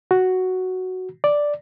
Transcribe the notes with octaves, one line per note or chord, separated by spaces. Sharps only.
F#4
D5